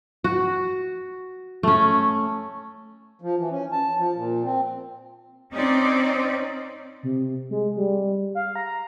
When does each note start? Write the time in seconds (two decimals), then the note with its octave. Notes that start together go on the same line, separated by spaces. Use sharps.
0.24 F#4
1.63 A3 C#4
3.22 F3
3.38 E3
3.50 C#4
3.72 A5
3.98 F3
4.15 A#2
4.44 C4
5.53 C4 C#4 D#4 D5
7.03 C3
7.50 G#3
7.77 G3
8.35 F5
8.56 A#5